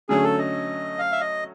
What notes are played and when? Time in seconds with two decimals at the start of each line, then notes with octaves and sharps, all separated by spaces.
0.09 D3 F#3 A3 C#4 G#4
0.24 A4
0.39 D#5
0.99 F5
1.12 E5
1.21 D#5